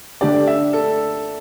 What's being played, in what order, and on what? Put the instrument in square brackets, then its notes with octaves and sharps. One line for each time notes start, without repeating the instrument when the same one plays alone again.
[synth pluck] D3 A3 D4 G4 [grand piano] D5
[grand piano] E5
A4